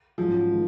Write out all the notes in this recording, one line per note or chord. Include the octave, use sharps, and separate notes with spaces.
G#2 F3 F#3 C#4 G#4
D#3 G#3